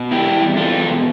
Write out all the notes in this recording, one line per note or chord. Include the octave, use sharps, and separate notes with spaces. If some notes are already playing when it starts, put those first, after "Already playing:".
Already playing: B2
E2 E4 G4
G3
E2 F4 A4
B2